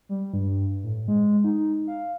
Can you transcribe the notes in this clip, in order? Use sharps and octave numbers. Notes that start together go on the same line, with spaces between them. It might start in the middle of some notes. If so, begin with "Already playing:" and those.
G3
G2
A2
G#3
D#4
F5